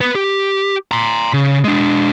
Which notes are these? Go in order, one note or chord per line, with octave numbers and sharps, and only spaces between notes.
B3 B4
G4
A#5 C6
C#3
G#3 D4